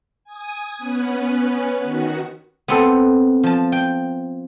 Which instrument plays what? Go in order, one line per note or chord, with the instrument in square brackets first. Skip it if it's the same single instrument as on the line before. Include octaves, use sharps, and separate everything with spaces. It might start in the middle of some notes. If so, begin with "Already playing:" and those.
[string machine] G#5 D#6
B3 C#4 B4
D#3 F#4
[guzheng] B3 C4 A4
F3 A5
G5